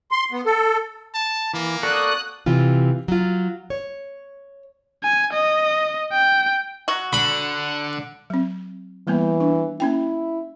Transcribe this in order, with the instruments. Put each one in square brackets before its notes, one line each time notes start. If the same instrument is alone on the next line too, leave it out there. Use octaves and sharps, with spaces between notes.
[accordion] C6
B3
A4
[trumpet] A5
[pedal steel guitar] E3 [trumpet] A#3
[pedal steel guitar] F#4 A4 D5 [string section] D#6 F#6
[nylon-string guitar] C3 E3 F4
F#3 F4
C#5
[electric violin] G#5
D#5
G5
[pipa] F#3 F#4
[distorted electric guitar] D3 [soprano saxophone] F#5 [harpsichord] B5
[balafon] F#3 C4
[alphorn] E3 [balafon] G3 A#3 B3
[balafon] D4
[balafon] A#3 C#4 G5 [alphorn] E4